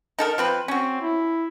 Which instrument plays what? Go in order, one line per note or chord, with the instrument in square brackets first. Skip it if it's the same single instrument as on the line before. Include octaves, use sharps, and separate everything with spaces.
[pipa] D#4 A4 A#4
F3 C4 B4
[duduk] C4 [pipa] C#4 F#4
[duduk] E4